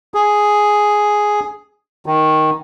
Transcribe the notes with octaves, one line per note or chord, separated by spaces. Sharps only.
G#4
D#3